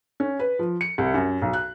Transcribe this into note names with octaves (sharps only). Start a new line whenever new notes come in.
C#4
B4
F3
C#7
C2
F#2
B1
F#6